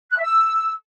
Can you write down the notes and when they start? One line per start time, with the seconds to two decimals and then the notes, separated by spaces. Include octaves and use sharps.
0.10 F#6
0.16 E5
0.22 E6